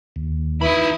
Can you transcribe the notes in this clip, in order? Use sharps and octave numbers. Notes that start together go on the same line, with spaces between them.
D#2
E3 D#4 E4 B5 D#6